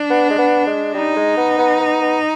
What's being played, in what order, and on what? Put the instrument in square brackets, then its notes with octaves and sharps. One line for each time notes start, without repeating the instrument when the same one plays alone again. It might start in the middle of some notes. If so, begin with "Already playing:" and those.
Already playing: [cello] D4
[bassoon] B3
G#3
B3
G#3
[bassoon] G3 [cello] D#4
[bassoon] G#3
B3
B3
B3
B3